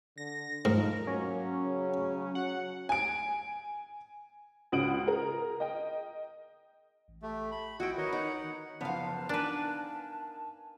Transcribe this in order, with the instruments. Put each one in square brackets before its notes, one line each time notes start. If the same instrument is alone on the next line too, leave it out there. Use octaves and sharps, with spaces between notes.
[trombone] D3 [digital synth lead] A#6
[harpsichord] G#2 [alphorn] F3 [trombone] D#4 [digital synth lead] A#4
[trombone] F#3 [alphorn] A#3 [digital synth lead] C#4
[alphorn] C#3
[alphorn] F#3 [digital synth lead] F#5
[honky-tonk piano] G#5 D7
C#2 C#4 F#4 D#6 D7 F#7
G#4 A#4
D#5 G5
[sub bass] A1
[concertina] A3 [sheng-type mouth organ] G4
[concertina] B5
[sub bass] A#1 [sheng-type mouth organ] C4 D#5 [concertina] E4 F#5 [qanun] F#4 G5
[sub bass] D#3 [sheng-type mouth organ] A#4 B4 C#5 [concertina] D#5 F#5
[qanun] D#4 [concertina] F#5
[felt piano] F#1 F3 [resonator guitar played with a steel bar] B3 F5 [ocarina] A5
[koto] D4 B4 [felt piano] D#4 A#4 G#5